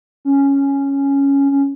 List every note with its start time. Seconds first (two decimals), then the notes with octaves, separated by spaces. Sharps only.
0.25 C#4
1.51 C#4